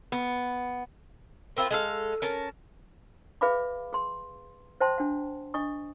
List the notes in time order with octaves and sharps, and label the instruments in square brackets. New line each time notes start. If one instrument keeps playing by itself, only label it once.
[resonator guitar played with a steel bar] B3
[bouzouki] A#3 C4 E4 F4
G#3 A4 F5
C#4 A#4 A5
[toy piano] G#4 B4 E5 F5 B5 D6
G#4 C6
C5 E5 G5 A5 C6
D4 F#5
D4 D#5 C#6 D#6